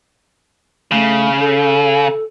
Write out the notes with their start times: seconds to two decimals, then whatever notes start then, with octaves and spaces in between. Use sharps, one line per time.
0.91 C#3 A3
1.40 A4